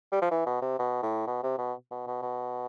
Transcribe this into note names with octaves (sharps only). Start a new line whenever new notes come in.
G3
F3
E3
B2
C3
B2
A2
B2
C3
B2
B2
B2
B2